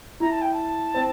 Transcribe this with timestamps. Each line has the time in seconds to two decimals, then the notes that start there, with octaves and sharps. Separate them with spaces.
0.20 E4 A#5
0.31 A5
0.42 G5
0.53 A5
0.94 C4